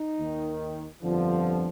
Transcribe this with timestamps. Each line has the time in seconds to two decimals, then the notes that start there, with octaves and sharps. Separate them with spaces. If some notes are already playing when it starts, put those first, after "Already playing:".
Already playing: D#4
0.18 D#2 D#3
1.03 G1 F2 D3 F3